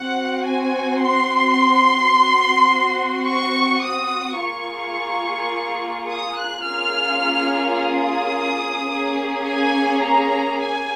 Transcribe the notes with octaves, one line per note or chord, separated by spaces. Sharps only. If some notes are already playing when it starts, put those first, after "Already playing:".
Already playing: C4 F#4 F#5
G#5
C6
C4 F#4
C#6
D#6
A#3 F4 G#4 C#6
D#6
F#6
A#3 C#4 F4 G#4 F6
D#6
A#3 C#4 G#4
G#5
A#5
G#5